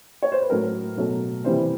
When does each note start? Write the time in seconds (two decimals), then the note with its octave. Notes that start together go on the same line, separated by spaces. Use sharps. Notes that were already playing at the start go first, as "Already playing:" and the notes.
0.22 C#5
0.32 C5
0.41 B4
0.50 A2 F#3 A3 A#4
0.97 B2 F#3 A3
1.44 C3 E3 G3 C5